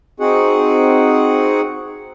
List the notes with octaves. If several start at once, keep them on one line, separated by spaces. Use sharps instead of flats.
C4 D#4 F#4 G#4 F#5